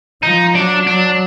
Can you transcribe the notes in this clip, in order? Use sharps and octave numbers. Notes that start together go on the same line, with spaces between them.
F3 D#4
F#3 D4
F#3 D4